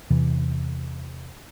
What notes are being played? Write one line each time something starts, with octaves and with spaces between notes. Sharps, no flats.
E2 C3 E3